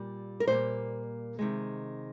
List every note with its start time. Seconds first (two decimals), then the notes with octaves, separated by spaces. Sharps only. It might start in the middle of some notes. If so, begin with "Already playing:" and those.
Already playing: A#2 G3 A#3
0.40 A#4
0.48 A#2 G3 A#3 C5
1.39 C3 D#3 G#3